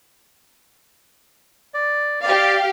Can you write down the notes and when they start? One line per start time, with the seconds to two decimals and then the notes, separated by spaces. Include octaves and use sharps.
1.74 D5
2.23 G4 D5 F5